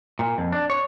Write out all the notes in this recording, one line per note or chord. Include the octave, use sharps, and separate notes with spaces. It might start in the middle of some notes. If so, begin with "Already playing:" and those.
A#2
F2
D4
C#5